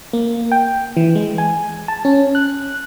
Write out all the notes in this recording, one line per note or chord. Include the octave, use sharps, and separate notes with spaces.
A#3
G5
E3
G#3
G#5
A5
C#4
F#6